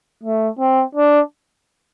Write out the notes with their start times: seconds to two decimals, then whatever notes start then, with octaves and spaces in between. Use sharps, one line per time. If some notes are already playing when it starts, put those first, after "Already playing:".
0.23 A3
0.59 C4
0.95 D4